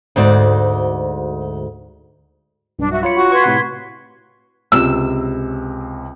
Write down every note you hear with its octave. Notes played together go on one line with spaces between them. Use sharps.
D2 G#2 F#4 D5
B1 G2 D4
F#4 E5
F4 C#5 B5 C#7
F#4
B4 C6 C#6 G#6
A2 C3 F#5
C#2 C3 E6